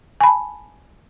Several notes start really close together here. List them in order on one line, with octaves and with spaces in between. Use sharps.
G#5 B5 A5